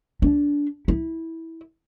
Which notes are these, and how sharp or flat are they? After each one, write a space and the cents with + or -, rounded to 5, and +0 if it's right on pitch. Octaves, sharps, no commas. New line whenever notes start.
D4 -20
E4 -15